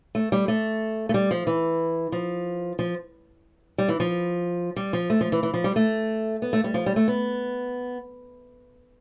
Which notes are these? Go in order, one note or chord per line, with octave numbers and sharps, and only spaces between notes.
A3
G3
A3
A3
G3
F3
E3
F3
F3
G3
E3
F3
G3
F3
A3
F3
E3
E3
F3
G3
A3
B3
A3
G3
F3
G3
A3
B3